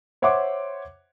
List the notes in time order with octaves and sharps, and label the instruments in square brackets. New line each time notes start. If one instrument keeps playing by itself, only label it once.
[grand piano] C5 C#5 E5 F#5 C6 D6